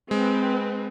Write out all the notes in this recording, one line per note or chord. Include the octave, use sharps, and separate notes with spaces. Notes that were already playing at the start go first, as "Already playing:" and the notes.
G#3 C4 B4